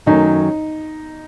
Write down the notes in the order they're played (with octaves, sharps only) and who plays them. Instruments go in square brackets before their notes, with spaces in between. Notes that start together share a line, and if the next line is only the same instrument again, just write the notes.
[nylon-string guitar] F#2 D#3 F#3 A3 C#4 [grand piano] D#4